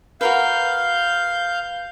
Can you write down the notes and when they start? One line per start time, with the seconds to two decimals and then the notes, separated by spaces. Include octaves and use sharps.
0.21 F#4 A#4 B4 F5 G6